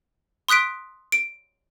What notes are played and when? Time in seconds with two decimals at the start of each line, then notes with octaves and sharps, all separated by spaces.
0.49 C6 D#6 F#6 B6 D7
1.12 D7